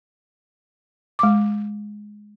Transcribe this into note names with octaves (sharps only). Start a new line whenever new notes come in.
G#3 D6